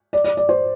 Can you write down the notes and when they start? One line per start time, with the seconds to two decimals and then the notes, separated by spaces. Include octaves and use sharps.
0.13 D5
0.24 D5
0.37 D5
0.49 C5